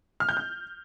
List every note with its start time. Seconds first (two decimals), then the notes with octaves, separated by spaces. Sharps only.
0.20 F6
0.29 G6
0.37 F6